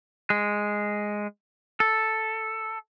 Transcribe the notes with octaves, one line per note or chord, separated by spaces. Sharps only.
G#3
A4